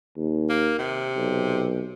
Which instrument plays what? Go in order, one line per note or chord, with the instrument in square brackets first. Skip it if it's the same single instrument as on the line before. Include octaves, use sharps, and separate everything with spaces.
[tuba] D#2
[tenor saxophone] A#3
C3
[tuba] B1